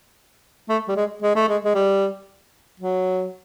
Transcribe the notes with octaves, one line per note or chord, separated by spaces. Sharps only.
A3
G3
G#3
G#3
A3
G#3
G#3
G3
F#3